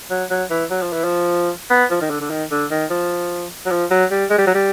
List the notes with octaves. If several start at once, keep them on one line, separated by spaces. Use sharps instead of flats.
F#3
F#3
E3
F#3
F3
E3
F3
B3
F3
D#3
D3
D3
D#3
D3
D#3
F3
F#3
F3
F#3
G3
G#3
G3
F#3
G3